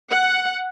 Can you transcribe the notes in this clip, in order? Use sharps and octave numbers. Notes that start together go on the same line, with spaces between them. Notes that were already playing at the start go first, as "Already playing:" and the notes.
F#5